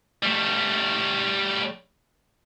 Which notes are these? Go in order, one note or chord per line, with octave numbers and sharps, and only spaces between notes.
G3 A3